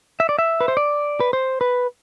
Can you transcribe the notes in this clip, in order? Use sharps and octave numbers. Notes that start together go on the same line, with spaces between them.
E5
D5
E5
B4
C5
D5
B4
C5
B4